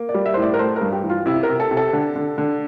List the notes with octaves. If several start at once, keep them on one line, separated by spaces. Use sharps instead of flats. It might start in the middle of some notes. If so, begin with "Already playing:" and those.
Already playing: A#3
D5
G3
E5
C5
A2
D5
A#4
A3 C5
A#4
G2
G4
E3
F4
C3 E4
A#4
C3
A4
C3
A4
D3
D3
D3